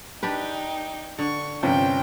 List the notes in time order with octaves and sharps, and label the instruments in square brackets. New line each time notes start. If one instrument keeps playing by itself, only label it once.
[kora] D4 G4 B4 [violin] D#4 G5
[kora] D3 [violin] C#6
[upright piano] G1 C3 C#4 [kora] F3 [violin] G5